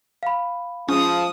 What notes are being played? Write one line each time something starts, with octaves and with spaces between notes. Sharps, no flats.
F5 B5
F3 G#3 C#4 D#6